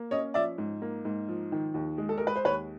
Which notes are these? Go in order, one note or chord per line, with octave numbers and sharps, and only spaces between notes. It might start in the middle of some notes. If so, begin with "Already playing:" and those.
Already playing: A#3
C#4 C#5 D#5
F3 D5 E5
G#2
A#3
G#2
F3
D#3
D#2
G#3
A4
G#3 A#4
B4
C5
D#2 B4 C#5